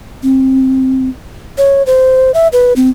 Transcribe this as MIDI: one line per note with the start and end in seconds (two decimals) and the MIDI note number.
0.23 1.09 60
1.58 1.83 73
1.86 2.31 72
2.34 2.48 76
2.52 2.73 71
2.76 2.90 60